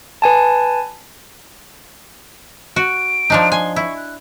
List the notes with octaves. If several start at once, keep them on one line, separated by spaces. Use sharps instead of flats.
B4 G#5 A5
F#4 D7
F3 D4 D#4
G#5 C6
E4 C#6
F#6